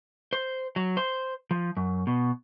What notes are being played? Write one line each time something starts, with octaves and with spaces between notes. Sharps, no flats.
C5
F#3
C5
F3
F#2
B2